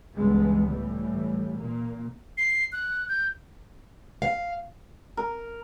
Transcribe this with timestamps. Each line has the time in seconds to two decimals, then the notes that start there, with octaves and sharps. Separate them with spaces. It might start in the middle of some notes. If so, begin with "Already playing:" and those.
0.14 C#2 G2 E3 G#3 B3
0.67 A2 E3 G3
1.57 A#2 A#3
2.37 C7
2.72 F#6
3.08 G6
4.22 F5
5.17 A#4